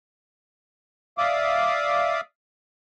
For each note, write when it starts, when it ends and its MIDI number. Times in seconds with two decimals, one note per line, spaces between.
1.18 2.21 74
1.18 2.21 76
1.18 2.21 77
1.18 2.21 86
1.18 2.21 87